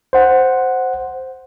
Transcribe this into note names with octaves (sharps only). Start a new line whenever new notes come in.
C5 F#5